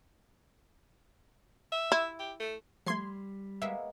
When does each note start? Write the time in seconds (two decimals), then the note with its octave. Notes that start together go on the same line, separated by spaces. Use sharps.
1.72 E5
1.92 E4
2.19 G4
2.40 A3
2.87 F3 G3 A3 C6 G#6 C7
3.62 G#3 A#3 B3 E5